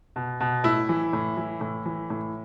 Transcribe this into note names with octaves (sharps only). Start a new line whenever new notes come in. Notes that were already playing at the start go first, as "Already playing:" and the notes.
B2
B2
A2 E4
E3
A2
E3
A2
E3
A2